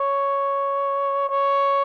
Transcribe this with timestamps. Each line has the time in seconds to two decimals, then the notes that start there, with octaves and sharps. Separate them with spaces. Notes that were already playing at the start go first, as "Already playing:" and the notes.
Already playing: C#5
1.29 C#5